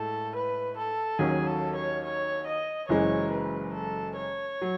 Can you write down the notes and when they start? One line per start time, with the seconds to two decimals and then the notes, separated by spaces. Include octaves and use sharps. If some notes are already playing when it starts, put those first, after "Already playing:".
Already playing: A2 G#3 A4
0.35 B4
0.77 A4
1.18 D#2 D#3 F#3 C#4 G#4
1.47 A4
1.75 C#5
2.04 C#5
2.46 D#5
2.88 F#1 F#2 E3 G#3 C#5
3.31 B4
3.73 A4
4.16 C#5
4.61 F#3